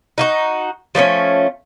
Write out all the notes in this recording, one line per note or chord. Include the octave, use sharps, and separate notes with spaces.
D#4 F4 F#4
F3 A3 B3 C#4